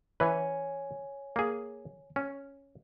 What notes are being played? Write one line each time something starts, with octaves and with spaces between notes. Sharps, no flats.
E3 B4 C#5 G#5
A#3 G#4
C#4